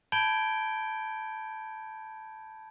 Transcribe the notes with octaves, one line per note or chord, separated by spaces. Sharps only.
A5 B5 G6 G#6 D7 G7